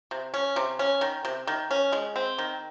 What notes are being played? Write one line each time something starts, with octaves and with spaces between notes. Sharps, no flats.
C3
C#4
C3
C#4
D#3
C3
D#3
C#4
G#3
C4
D#3